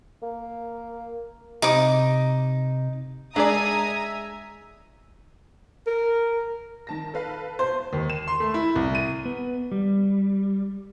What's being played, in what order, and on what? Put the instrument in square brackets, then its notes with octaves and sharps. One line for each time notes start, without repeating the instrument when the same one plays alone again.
[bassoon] A#3
[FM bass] C3 [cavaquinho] D#4 D6
[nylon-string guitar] G#3 [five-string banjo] D4 G#4 D5 [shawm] E5 [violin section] G#5 A#5 D#6
[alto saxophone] A#4
[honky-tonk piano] D#3 A5 A#6
A4 B4 F5
[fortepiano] C5
[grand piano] D#2
E7
C6
A3
E4
C2
D#7
[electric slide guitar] B3
G3